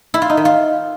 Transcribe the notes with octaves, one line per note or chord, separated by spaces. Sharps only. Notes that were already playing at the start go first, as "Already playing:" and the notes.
E4
F4
D#4
D#3
F4